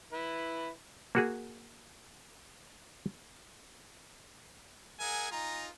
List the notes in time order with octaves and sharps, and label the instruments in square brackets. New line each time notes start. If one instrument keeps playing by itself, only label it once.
[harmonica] E4 B4
[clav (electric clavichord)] A#3 F#4 G#4
[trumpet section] G#4 A#4 E5 F#5 G#5
D#4 F4 G#5 A#5